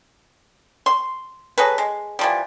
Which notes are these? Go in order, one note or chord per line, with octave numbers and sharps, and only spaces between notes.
C6
F#3 G#4 A4 B4
G#3
E3 F3 G3